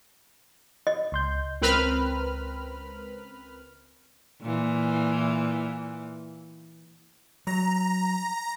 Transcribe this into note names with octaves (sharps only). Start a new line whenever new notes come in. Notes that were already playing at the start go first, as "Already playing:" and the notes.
D#5
C#2 C6 G6
C#2 C4 A#4 B4 B5 F6
A#2 E3
F#3 A#5